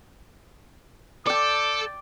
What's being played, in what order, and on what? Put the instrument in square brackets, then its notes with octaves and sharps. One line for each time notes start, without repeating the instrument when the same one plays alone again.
[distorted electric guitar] A4 [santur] D5 G5 [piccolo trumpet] D6